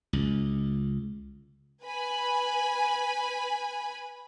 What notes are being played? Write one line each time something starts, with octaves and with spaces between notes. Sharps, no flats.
C#2
B4 G#5 B5